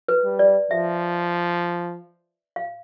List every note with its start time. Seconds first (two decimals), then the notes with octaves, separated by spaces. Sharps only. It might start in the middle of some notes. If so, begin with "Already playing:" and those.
0.08 B4
0.24 G3
0.39 D5
0.71 F3 E5
2.56 F5